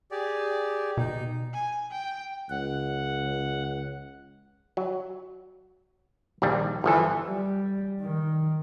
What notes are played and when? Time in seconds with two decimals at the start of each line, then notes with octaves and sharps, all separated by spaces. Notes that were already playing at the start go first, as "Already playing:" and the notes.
0.11 G4 G#4 D5
0.97 B2 D#4
1.53 G#5
1.91 G5
2.50 C#2 F#5
4.77 F#3
6.42 A#1 D#2 G3
6.84 G1 E3 F3 A4
7.26 G3
8.01 D#3